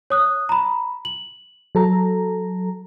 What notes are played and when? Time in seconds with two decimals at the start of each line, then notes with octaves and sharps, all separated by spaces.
0.10 C#5 D#6 F#6
0.49 A#5 B5
1.05 F#7
1.75 F#3 A4 A#5